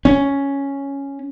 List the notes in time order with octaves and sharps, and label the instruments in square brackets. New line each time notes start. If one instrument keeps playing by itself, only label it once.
[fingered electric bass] C#4